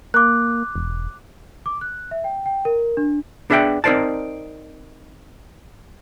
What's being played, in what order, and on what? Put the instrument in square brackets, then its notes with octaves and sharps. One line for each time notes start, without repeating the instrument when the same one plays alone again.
[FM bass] A#3 [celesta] D6 F#6
[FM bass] E1
[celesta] D6
F#6
E5
G5
G5
A#4
D4
[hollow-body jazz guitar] B3 D4 G#4 E5 F#5 G5
C4 D#4 A#4 C5 D5 A5